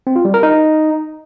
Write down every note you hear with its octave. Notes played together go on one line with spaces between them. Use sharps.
C4
F4
G3
A#4
D#4